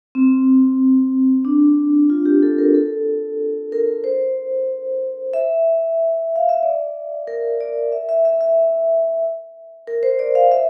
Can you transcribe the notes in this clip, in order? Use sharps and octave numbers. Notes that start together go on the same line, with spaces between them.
C4
D4
F4
G4
A4
A#4
A4
A#4
C5
E5
F5
E5
D5
A#4
D5
E5
E5
E5
E5
A#4
C5
D5
F5
E5